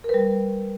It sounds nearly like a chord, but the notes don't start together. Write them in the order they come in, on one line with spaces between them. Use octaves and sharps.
A#4 B4 G3